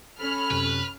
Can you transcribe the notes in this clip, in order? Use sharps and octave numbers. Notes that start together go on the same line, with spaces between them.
C#4 A4 B5 F6
F#2 C3 B4